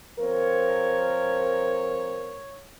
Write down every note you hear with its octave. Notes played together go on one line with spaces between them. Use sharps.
F3 C4 A#4 C#5